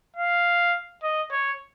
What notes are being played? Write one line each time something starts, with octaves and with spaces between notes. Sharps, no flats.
F5
D#5
C#5